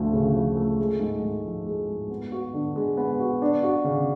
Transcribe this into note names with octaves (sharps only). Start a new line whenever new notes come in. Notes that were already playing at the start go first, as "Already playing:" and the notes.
Already playing: D2 F3 A3
C#3
F3
A3
G#3
G#2
G#2
F3
G#3
G#2
B3
F#4
D3
G#3
B3
F#4
D4
F#4
C#3